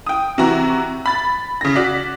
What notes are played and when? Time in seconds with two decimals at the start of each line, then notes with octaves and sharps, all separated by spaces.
0.06 G5 D#6
0.38 C3 E3 F#4 A#5 C#6
1.06 B5 A6
1.61 C#3 A#6
1.76 F#4 D5 B6